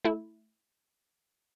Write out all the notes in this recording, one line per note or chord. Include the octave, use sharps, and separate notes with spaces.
A3 E4